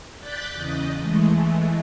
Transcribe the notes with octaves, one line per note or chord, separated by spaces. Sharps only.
D5 F#6 G6 A6 B6
E2 C#3 D#5
E3 G#3 A3